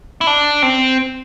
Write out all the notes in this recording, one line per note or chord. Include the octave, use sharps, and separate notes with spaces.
E4
D4
C4